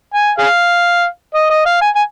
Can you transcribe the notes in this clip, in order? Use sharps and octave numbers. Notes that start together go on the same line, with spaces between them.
G#5
G#4 F5
D#5
D#5
F5
G#5
G#5